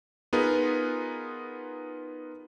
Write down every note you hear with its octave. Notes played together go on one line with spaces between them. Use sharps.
B3 D#4 F4 G#4 A#4 B4